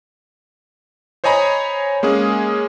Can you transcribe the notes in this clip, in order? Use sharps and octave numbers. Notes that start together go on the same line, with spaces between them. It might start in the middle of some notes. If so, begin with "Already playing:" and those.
C5 C#5 D#5 G#5 A#5 B5
G#3 A#3 C#4 G#4